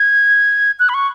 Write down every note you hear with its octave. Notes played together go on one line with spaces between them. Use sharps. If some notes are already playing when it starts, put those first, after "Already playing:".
Already playing: G#6
F#6
B5
C#6